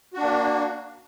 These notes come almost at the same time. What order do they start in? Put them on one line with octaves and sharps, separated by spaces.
F#4 D4 A#3